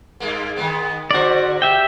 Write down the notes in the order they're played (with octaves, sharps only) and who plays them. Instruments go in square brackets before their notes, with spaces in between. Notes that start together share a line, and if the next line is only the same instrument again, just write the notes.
[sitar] G2 G#3 A#3
D#3 G#3 B3
[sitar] G#2 D3 C5 [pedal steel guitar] F#4 D5
[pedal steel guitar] G4 E5 G5